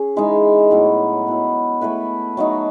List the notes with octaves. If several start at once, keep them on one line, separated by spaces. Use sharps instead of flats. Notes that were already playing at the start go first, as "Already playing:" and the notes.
Already playing: C#4 G#4
E3 G#3 D#4
A2 F#3 B3
F#3 B3 E4
A3 E4 B4
F#3 A3 D#4